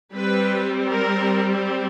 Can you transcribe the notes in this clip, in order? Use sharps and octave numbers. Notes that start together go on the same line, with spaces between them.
G3 C4 B4
A#4